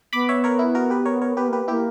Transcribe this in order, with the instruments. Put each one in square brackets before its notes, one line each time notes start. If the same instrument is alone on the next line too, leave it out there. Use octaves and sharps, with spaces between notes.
[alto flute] B3 [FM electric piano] B5 D6
[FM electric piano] C#5 E5
A#4 C#5
E4
F#4 A#4
G4 B4
A#4 C#5
A#4 C#5
[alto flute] B3 [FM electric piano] G4 B4
[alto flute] A#3 [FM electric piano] G4 B4
[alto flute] A#3 [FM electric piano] E4 G4